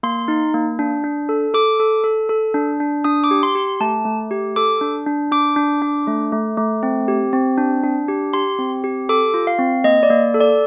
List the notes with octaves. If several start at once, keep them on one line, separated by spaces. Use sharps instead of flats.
A#3 C6
D#4
A#3
D4
D4
A4
A4 D6
A4
A4
A4
D4
D4
D4 D#6
D6
G4
C6
G4
A3 A5
A3
G4
A4 D6
D4
D4
D4 D6
D4
D4
A3
A3
A3
C4
G4
C4
D4
D4
G4
G4 C6
C4
G4
A4 D6
F4
F5
C4
A#3 D#5
D5
A#3
A4
D5